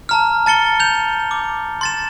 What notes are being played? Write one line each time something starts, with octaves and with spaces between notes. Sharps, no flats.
A5 A#5 F6
A5 A6 C#7 G7
G6 F7
D6
C6 A6 E7